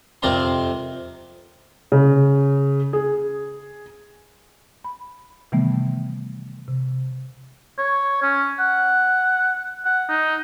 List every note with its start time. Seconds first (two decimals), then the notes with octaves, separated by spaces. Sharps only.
0.22 F2 C3 A#4 D5 A#5 C6
1.92 C#3
2.93 G#4
4.84 B5
5.52 C3 D#3 E3 G3 A3 B3
6.68 C3
7.78 C#5
8.22 C#4
8.59 F#5
9.85 F#5
10.09 D#4